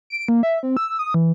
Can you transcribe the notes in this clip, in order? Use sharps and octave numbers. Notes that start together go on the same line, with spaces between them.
D7
A#3
E5
C4
E6
D#6
E3